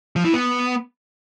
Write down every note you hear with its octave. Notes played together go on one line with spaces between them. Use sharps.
F3
E3
B3